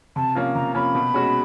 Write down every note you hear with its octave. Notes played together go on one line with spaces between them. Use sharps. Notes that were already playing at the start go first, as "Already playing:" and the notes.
C3 A5
F3 A#3 C#4
C3 A#5
F3 A#3 C#4 B5
B2
G#3 C#4 F#4